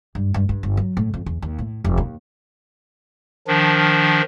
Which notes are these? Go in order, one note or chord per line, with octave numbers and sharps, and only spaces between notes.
G2
G2
G2
G1
F#3
A2
F2
E2
D#2
A2
F1
D#2
D#3 F3 D4